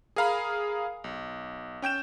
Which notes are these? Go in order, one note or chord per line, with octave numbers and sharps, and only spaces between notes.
G#4 A#4 F5 A#5 B5
B1
C#4 G5 G6 E7